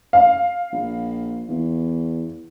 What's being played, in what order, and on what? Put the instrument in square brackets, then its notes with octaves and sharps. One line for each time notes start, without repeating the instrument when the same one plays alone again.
[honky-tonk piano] F5
[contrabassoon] A#1
E2